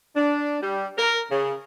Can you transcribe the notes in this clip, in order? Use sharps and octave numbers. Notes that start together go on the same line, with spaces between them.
D4
G3
A#4
C#3